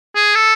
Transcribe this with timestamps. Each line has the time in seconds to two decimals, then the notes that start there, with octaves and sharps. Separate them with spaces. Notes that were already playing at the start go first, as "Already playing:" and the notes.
0.15 G#4
0.35 A4